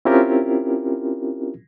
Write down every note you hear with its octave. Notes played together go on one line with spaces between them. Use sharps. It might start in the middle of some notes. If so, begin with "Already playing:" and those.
C4 C#4 E4 F4 G4 A#4